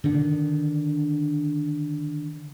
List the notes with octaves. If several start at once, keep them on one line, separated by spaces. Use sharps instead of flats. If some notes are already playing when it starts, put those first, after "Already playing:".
D3 D#3 D4